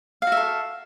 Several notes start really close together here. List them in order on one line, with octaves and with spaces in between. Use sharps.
F5 F#4 E5 A4